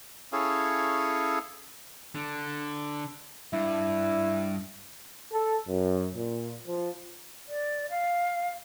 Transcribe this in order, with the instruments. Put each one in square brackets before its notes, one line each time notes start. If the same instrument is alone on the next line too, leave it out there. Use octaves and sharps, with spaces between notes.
[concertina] C#4 E4 G#4 A4 C#5 F5
[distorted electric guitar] D3
[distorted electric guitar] G2 [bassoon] E4
[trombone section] A4
F#2
A#2
F3
[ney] D5
F5